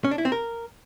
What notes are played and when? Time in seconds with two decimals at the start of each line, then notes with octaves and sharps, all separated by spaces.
0.04 C#4
0.11 D4
0.18 E4
0.25 C4
0.32 A#4